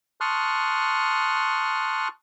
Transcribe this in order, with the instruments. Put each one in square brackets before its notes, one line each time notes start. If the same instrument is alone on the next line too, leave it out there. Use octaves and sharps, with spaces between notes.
[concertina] A5 C6 C#6 D#6 F6 F#6